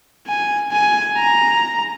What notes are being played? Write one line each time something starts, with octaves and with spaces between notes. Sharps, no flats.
G#5
G#5
A#5